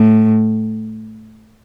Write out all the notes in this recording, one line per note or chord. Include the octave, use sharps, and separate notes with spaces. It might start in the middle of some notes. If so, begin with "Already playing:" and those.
Already playing: A2